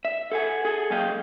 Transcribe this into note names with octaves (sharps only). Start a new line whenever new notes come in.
E5
A4 F#5 G#5
G#4 A4 G#5
C#2 F#3 A#3 D#5 F5 G5